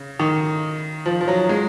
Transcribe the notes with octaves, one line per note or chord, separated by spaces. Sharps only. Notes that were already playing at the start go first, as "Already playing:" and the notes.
Already playing: C#3
D#3
F3
F3
F#3
G#3